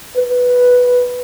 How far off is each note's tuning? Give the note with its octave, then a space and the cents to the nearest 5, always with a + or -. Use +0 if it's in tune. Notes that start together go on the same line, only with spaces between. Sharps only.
B4 +0